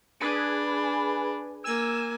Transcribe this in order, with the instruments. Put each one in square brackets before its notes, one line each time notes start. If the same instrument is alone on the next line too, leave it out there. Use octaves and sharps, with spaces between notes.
[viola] D4 [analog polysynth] G#4 B4 G#5
[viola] A#3 G#5 [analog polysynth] E6